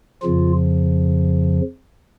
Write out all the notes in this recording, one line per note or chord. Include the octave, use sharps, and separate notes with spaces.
F2 C#3 F3 F4